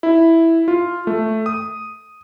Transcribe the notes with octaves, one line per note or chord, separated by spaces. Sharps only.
E4
F4
A3
D#6